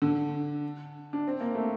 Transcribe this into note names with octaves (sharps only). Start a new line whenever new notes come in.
D3
D4
C4
A#3
A3